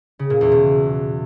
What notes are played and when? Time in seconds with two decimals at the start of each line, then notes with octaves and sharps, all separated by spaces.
0.19 C#3
0.30 A#2
0.41 E2
0.52 B2